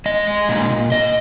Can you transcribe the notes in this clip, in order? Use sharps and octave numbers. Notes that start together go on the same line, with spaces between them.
G#3 D#5
G#3
A#2
A#2
A#2 D#5